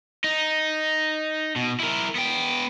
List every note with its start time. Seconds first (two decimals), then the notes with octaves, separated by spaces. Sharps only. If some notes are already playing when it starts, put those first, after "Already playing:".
0.24 D#4
1.56 B2
1.80 E4 A#4
2.15 B3 G5